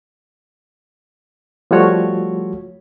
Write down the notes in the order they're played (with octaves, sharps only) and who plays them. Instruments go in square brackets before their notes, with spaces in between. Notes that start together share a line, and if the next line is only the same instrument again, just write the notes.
[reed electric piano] F3 G3 A3 F4 F#4 C#5